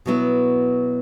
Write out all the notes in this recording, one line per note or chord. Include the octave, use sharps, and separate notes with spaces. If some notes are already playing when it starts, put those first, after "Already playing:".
B2 F#3 B3 E4